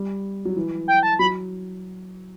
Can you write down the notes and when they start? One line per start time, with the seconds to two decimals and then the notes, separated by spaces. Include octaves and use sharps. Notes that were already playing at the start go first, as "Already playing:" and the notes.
Already playing: G3
0.45 F#3
0.56 E3
0.88 G5
1.03 A5
1.19 F#3 B5